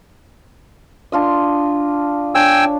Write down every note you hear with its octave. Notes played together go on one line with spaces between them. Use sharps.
D4 F4 D#5
D4 C#5 G5 G#5 E6